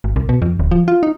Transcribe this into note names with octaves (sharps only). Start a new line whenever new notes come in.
G#1
C2
B2
F2
D1
F3
F4
D#4